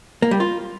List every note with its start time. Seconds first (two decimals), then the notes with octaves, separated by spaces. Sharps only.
0.22 A#3
0.31 G3
0.40 F4